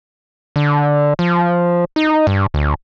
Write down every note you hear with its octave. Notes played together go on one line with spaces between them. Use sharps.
D3
F3
D#4
G2
D2